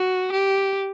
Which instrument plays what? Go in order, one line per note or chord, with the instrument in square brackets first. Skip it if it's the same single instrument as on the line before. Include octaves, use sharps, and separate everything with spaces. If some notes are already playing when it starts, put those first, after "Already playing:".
Already playing: [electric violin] F#4
G4